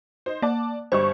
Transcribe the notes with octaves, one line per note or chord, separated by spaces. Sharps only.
D#4 C5
A#3 D5 A5
G1 G3 C5 C#6